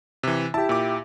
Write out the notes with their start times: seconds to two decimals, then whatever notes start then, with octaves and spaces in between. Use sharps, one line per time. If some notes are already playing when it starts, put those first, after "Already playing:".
0.23 C3 E3
0.54 E4 G4 A5
0.69 A#2 D6